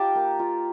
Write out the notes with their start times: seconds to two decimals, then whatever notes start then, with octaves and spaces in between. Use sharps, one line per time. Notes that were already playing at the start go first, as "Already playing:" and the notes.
Already playing: D#4 F4 G4 F5 G5 A5
0.15 A#3
0.39 F4